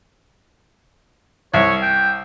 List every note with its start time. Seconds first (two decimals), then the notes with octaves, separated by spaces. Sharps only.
1.54 C2 C#5
1.82 G5